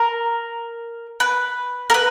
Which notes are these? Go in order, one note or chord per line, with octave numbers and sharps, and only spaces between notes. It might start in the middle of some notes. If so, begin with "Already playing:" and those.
Already playing: A#4
B4
A#4
B4